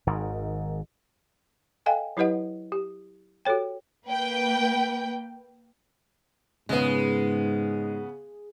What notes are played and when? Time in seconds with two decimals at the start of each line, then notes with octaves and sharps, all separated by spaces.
0.07 G#1 G#2 D#3
1.86 A4 D#5 F5 G5 G#5
2.17 F#3 E4 G4 B4 D#5 F#5
2.72 G4
3.45 F#4 G4 A4 C#5 G5
4.06 A#3 B4 G5
6.69 G#2 C#3 G#3 B3